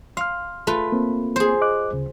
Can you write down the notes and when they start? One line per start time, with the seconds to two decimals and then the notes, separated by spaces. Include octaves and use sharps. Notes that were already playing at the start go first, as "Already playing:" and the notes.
0.17 F5 C6 F6
0.67 A3 F4 B4
0.92 A#3 C4
1.36 G#4 C5
1.61 D#5 D6 F#6
1.93 D2 C#3